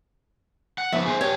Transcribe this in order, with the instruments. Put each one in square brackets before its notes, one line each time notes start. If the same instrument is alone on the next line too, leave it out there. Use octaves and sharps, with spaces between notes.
[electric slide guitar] F#5
[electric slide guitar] F3 A3 B3 [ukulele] E5
[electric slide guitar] G#4 B4 C5
[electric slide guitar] G4 A4 [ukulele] C#5